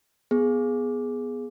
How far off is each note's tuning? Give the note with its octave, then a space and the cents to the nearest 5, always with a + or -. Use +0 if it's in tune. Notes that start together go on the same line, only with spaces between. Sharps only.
B3 +0 G#4 +5